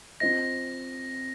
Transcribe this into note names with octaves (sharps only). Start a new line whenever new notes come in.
C4 F4 C5 D#5 A#6